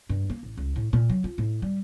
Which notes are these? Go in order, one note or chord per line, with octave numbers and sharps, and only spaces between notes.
G2
A#3
A1
C#2
A2
A#2
F#3
F4
A2
G3